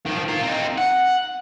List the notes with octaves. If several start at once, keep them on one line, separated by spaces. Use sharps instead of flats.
D#3 F3
F4 A#4
C4 D#4
F#5